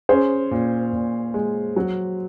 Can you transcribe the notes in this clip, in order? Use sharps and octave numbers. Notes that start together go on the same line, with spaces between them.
C#4 G#4 C5
A#2
A#2
G#3
F#3